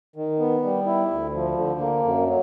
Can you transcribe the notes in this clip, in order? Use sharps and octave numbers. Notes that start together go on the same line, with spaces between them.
D#3
B3
G3
E4
D2
F3
D3
A#3
F#2
F#3